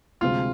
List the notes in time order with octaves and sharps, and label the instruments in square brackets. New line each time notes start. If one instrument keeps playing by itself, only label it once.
[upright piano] D2 C3 F3 G#3 C4 [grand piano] F4